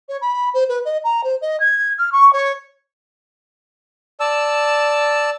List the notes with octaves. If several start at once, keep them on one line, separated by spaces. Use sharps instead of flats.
C#5
B5
C5
B4
D#5
A#5
C5
D#5
G#6
F6
C#6
C#5
D5 A5 E6